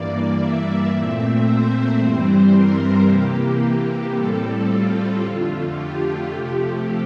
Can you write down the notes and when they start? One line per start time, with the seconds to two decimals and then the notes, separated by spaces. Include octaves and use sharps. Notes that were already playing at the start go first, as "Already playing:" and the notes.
Already playing: G2 E3 A#3 D5
0.35 E5
0.88 A#2 A3 C4
1.43 C5
1.97 G2 E3 G3 C4
2.51 A#4
3.05 C3 E3 A#3 G4
4.13 A2 G3 C4 A4
4.68 F4
5.22 F2 D3 A3 F4
5.75 G4
6.30 C3 F3 A3